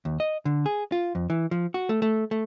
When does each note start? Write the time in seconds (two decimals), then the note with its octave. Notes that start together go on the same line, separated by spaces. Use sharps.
0.05 D#2
0.20 D#5
0.45 D3
0.66 G#4
0.92 F4
1.15 F2
1.30 E3
1.51 F3
1.74 F#4
1.89 A3
2.02 A3
2.31 A3